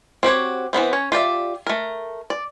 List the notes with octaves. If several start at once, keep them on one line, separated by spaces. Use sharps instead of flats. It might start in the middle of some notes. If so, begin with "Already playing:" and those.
C4 F#4 G4 C#5
E3 G3 B3 C4
C#4 C#5
F4 G4 D5 E5
A3 A#4
D5